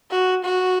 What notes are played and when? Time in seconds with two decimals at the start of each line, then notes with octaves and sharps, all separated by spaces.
0.11 F#4
0.45 F#4